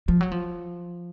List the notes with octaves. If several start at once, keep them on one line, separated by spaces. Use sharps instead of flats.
F3
F#3
F3